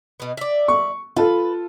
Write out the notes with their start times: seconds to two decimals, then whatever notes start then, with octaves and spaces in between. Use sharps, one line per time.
0.20 B2 B3
0.37 D5 E5
0.68 C#6
1.16 F4 A4 B4